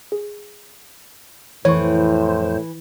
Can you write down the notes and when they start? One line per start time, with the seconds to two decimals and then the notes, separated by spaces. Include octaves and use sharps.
0.12 G#4
1.65 F2 A2 E3 C5 C#5 C#6